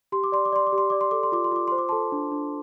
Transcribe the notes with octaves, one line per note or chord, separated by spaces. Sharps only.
G4 C6
D6
D5 C6
D6
D5 C6
D6
G4
C6
D5 D6
C6
A4 D6
C6
F4 D6
C6
F4 D6
C5 C6
D6
A4 A5 C6
D4
D4